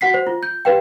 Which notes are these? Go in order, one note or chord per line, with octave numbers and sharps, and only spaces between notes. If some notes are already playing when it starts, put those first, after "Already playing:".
F#4 F#5 B6 C7
C5
F4
G6
G4 B4 F5 G5